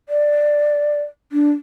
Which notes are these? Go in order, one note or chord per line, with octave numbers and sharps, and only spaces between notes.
D5
D4